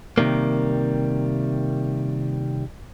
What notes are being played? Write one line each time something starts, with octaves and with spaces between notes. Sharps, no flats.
C3 D#3 G3 A#3